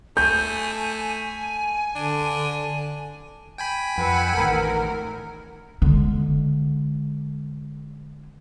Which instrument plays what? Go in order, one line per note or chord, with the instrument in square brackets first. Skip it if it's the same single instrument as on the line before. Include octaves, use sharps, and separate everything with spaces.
[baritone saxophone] A3 [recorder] G#5 [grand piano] G6
[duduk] D3 [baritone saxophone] D4
[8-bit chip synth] G5 G#5 B5
[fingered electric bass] F2 [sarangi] B4 [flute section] F#5 E6
[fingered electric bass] A1 D#3 [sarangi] A#4
[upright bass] D3 G#3